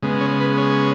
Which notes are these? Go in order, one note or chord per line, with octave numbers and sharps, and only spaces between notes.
C#3 G#3 B3
C#5
B4
C#5